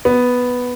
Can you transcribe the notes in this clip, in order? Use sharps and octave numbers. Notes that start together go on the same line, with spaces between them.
B3